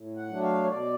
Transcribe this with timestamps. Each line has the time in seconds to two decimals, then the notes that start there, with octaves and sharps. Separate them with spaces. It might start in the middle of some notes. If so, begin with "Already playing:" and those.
Already playing: A2
0.17 F#5
0.29 F#3 A3 D4
0.43 F5
0.64 C#5
0.68 B2 D5